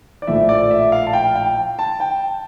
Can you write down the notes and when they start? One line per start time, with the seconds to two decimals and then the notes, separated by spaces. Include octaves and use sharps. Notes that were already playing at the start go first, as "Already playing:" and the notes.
0.22 D5
0.27 A#1 A2 F3 A3 E5
0.49 D5
0.71 E5
0.92 F5
1.07 A5
1.13 G5
1.36 G5
1.79 A5
2.00 G5